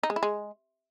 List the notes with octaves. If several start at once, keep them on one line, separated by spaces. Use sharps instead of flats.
D#4
G#3
E4
G#3